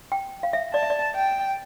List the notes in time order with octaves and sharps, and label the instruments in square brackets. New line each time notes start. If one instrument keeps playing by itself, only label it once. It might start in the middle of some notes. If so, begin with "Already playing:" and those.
[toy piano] G5
F5
E5
[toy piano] D5 [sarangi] A5
[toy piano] E5
D5
[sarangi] G5